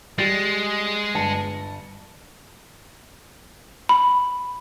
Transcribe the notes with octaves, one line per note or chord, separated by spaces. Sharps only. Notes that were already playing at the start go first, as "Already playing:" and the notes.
G3 G#3 A6 D7
G1 A5 C#7
B5